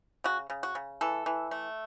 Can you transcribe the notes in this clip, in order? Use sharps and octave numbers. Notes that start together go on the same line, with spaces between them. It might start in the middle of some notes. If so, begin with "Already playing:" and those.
C#3 F#4
C#3
F#4
C#3
E3 A4
E3
A3